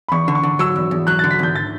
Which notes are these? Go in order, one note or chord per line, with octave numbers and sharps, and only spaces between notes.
B5
E2 C#6
D3
C#6
D3
F#3 E6
E2
E2
F#3 F#6
D3 A6
B6
E2 G6
A6